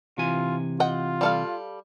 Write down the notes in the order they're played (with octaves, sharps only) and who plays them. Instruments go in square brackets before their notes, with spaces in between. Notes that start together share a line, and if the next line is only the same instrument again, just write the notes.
[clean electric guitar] C3 E3 G#5 [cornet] F4
[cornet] F4 [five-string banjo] D#5 F#5 G5
[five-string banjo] G3 A4 F5